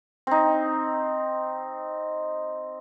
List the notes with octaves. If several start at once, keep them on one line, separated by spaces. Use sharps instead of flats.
C4 D#4